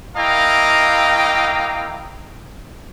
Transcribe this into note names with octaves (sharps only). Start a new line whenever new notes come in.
A#3 E4 D#5 F5 G5 A#5